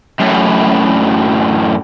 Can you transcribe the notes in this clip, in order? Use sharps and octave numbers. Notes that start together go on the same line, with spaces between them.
F#2 A2